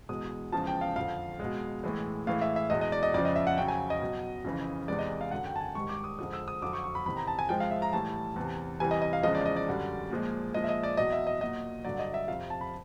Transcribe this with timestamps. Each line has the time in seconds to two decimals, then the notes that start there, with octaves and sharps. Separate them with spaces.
0.09 E2 B2 G#3 D#6
0.52 E2 C#3 F3 G#3 A5
0.67 G5
0.81 F5
0.96 F2 D3 F3 F5
1.40 B2 G#3
1.84 A2 E3 G#3
2.27 A2 E3 G#3 F5
2.41 E5
2.56 E5
2.70 E2 B2 G#3 D#5
2.81 D#5
2.92 D5
3.03 D#5
3.14 F2 C#3 F3 D5
3.25 D#5
3.36 E5
3.47 F#5
3.58 F2 C#3 F#3 G5
3.68 G#5
3.90 D#5
4.02 B2 F#3
4.45 F2 C#3 E3
4.88 E2 C3 E3 G#3 D5
4.99 D#5
5.21 F5
5.31 F#2 D3 F#3 F#5
5.46 G5
5.56 A5
5.61 G#5
5.75 G#2 D#3 G3 C#6
5.89 D6
6.04 D#6
6.19 F2 D3 F3 G#3 D#6
6.33 E6
6.48 D#6
6.62 F2 D3 F#3 D6
6.73 C#6
6.84 C#6
6.95 B5
7.06 E2 C3 D#3 B5
7.17 A#5
7.28 A5
7.39 G#5
7.49 G#2 F3 G#3 G5
7.60 F5
7.71 E5
7.82 A#5
7.93 A2 E3 G3 A5
8.36 E2 C3 E3
8.80 E2 C3 E3 G3 G#5
8.91 D#5
9.02 D#5
9.13 F5
9.23 E2 C#3 F3 G#3 D#5
9.35 D5
9.46 D#5
9.56 D5
9.67 F#2 D3 G3
10.10 A#2 F3 G#3
10.54 A#2 F3 G#3 D#5
10.64 E5
10.69 D#5
10.83 D5
10.97 E2 B2 F#3 D#5
11.13 E5
11.27 D#5
11.41 A#2 F#3 D#5
11.84 G2 D3 F#3 D5
11.99 D#5
12.14 E5
12.28 F2 C3 F3 F5
12.50 A5
12.61 B5